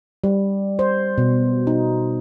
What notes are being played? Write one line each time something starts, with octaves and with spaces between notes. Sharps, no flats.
G3
C5
B2
D#4